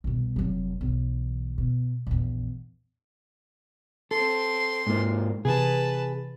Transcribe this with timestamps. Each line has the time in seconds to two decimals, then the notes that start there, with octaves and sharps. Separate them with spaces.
0.04 C2 B2
0.36 F1 F#3
0.81 B1 E3
1.58 B2
2.07 A#1 E2
4.11 C4 A4 C6
4.87 G#2 A#3
5.45 C3 E3 G#4 B4 A5